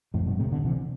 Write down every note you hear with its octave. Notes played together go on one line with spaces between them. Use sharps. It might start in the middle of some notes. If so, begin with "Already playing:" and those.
F2 A2
G2 B2
A2 C3
B2 D3
C3 E3